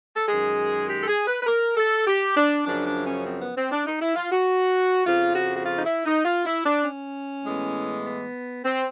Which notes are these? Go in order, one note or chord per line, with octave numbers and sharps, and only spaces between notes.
A4
F#2 D#3 G#3 G#4
G4
A4
G#4
B4
B4
A#4
A4
G4
D4
F#2 C#3 F3 D4
D4
C#4
C4
B3
C4
D4
D#4
E4
F4
F#4
F2 C#3 F3 F4
F#4
F#4
F4
D#4
E4
D#4
F4
E4
D4
C#4
A2 E3 G#3 B3
B3
C4